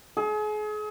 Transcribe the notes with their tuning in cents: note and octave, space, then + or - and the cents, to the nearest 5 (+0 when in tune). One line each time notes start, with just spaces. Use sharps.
G#4 +35